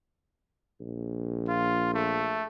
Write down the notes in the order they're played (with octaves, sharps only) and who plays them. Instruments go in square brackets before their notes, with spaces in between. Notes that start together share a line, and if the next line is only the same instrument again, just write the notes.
[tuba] A#1
[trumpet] F4
A3